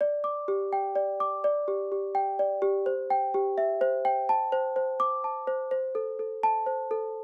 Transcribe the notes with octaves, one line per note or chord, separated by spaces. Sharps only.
D5
D6
G4
G5
D5
D6
D5
G4
G4
G5
D5
G4
C5
G5
G4
E5
C5
G5
A5
C5
C5
D6
A5
C5
C5
A4
A4
A5
C5
A4